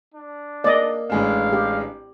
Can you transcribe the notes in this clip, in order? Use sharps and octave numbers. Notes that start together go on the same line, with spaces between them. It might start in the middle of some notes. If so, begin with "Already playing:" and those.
D4
A#3 D5 D#5
A1 G#3 D4 F5
G4